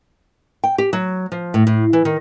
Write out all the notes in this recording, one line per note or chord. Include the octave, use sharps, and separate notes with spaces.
G5
G4
F#3
F3
A2
A2
E3
D#3